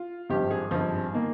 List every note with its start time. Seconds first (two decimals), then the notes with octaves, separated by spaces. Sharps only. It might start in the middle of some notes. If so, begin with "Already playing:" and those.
Already playing: F4
0.29 G#1 G2 F3 C4 G4
0.51 G#4
0.71 G#1 G2 F3 C4
1.13 D#3 A#3